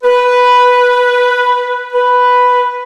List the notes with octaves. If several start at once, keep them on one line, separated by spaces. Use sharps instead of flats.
B4
B4